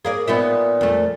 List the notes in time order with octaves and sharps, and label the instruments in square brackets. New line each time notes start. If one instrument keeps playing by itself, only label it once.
[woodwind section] A#3 [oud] G#4 A#4 D5
[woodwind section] A#2 [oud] B3 D#4 E5
[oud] F2 A3